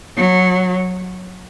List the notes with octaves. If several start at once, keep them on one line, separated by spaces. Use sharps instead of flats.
F#3